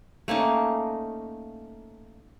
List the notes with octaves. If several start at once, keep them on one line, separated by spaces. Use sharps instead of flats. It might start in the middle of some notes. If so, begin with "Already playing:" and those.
A3 A#3 C#4 D#4